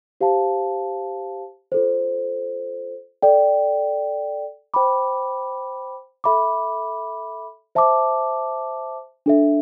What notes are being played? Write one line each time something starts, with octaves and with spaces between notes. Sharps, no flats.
G4 C5 F5 A5
F4 A4 C5
A4 D5 G5
C5 G5 B5 D6
A4 E5 B5 D6
C5 E5 A5 D6
D4 A4 E5